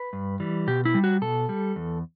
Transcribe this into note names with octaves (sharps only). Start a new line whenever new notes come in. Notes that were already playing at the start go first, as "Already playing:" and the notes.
Already playing: B4
G2
E3 G3
B2 G4
E4
G3
F#4
B2 A4
G3
E2